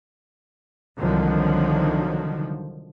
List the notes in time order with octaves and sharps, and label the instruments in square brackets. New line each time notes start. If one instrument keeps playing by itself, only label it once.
[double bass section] C2 D3 D#3 F3 F#3